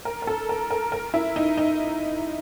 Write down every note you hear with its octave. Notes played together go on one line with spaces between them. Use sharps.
A#4
A#4
A4
A#4
A#4
A#4
E4
D#4
D#4